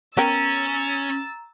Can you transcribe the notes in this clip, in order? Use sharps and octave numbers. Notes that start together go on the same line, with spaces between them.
B3 C#4 A#4 G5 A#5 E6 A6